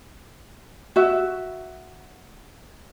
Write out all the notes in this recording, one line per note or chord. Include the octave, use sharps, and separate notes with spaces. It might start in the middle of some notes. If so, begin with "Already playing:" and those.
F#4 E5